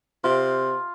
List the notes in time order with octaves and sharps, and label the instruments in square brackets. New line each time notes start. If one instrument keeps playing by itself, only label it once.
[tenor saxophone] C3 [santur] F4